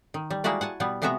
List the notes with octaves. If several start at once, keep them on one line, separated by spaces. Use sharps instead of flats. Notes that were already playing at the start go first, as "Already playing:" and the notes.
D#3
G3
G3 G#3 A#3 E4 F#4 D5
F#5 G#5 A5
B2 G3 B3
C3 G#3 B3 F#4 E5 A#5